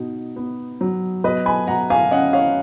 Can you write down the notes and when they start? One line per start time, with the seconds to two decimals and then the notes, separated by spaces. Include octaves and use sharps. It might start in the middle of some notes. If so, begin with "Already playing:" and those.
Already playing: B2 D#4
0.36 B3
0.81 F#3
1.24 B2 B4 D#5
1.46 G#5 B5
1.67 B2 F#5 A#5
1.90 F5 G#5
2.11 C#4 D#5 F#5
2.33 C#5 F5